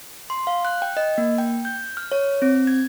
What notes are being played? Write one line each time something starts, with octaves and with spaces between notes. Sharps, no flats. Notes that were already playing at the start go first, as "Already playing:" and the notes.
C6
F5
F#6
G5
D#5
A#3
G5
G6
F6
C#5
C4
G#6